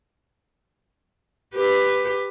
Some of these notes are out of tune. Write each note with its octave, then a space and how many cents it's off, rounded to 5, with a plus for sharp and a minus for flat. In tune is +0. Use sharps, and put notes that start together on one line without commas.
G4 +10 B4 +5